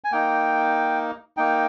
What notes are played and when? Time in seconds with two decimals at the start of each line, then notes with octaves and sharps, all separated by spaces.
0.04 G#5
0.12 A#3 D#4 G5
1.37 A#3 D#4 G5